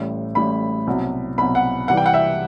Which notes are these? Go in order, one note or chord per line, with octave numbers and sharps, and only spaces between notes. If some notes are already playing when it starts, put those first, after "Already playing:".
Already playing: A1 A2 G3
A1 A2 G3 B5
C2 B2 F#3
C2 B2 F#3 B5
F#5
C2 C3 E3 G3 F#5
G5
F#5
E5